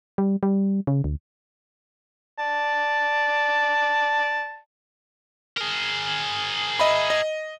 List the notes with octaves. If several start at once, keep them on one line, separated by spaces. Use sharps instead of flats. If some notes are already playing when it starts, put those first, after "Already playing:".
G3
G3
C#3
D2
D5 A5
G#4 A#4
D#5 E5 B5
D#5